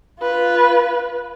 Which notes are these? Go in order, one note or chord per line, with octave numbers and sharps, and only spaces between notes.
F4 B4